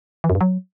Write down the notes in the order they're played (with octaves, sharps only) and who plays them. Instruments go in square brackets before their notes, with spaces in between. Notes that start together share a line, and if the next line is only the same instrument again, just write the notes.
[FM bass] E3
F#2
G2
F#3